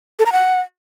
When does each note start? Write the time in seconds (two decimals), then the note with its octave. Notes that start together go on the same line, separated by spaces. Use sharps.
0.19 A4
0.26 A#5
0.32 F#5